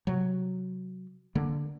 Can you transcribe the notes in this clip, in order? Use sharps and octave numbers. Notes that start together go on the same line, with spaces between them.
C3 F#3
D3 A#3